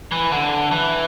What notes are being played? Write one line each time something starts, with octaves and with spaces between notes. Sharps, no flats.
E3
D3
E3